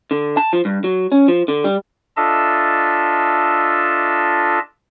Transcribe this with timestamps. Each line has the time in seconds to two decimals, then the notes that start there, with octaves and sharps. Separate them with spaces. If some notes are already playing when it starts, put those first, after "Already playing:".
0.11 D3
0.37 A5
0.53 F3
0.65 G2
0.84 F#3
1.12 C#4
1.28 F3
1.48 D3
1.64 G3
2.17 D4 F4 A4 D#5 E5 A5